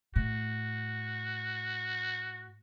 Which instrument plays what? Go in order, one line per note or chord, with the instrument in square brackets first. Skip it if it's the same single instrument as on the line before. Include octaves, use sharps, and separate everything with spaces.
[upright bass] A2 [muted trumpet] F#4